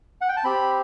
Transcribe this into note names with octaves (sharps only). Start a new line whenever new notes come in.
F#5
G5
A5
C4 G4 B5